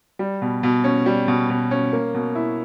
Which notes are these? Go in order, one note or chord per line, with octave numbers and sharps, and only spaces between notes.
G3
B2
B2
C#4
G3
B2
B2
C#4
A#3
B2
E4